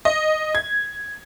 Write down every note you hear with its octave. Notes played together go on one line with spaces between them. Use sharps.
D#5
G#6